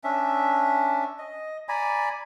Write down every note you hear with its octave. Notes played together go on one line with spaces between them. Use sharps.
C#4 D4 E5
D#5
D5 G#5 A#5 B5